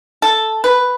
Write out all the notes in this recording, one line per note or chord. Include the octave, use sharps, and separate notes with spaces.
A4
B4